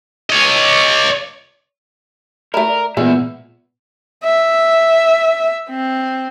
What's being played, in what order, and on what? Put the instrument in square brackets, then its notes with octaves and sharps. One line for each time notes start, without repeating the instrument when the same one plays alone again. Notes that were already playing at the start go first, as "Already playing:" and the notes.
[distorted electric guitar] C#5 D#5
[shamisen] A3 E4 [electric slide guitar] A#4
[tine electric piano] D5
[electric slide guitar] E2 E5 [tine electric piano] A#2 B3 [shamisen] G#3
[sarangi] E5
C4